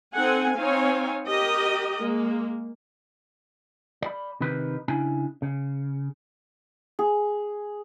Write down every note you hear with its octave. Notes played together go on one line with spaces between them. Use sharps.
C4 D#4 A4 F#5 G#5
C4 D#4 C#5 F5 G#5
G4 A#4 D#5
G#3 A#3
D5 B5
C3 D#3 D#4 B4
C#3 D4 E4 G#5
C#3
G#4